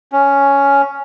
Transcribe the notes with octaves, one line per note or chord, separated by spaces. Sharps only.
C#4